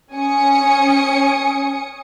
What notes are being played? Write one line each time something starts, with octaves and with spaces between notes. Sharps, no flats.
C#4 G#5 D#6 C#7